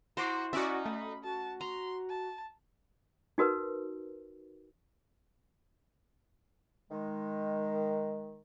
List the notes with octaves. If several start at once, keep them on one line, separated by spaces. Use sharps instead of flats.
E4 F#4 C5 A#5 C6 D6
C#4 D#4 F#4 D5 E5
A3 B5
F#4 A5
A#5 C6
A5
D#4 F#4 A#4 B4
D#3 G#3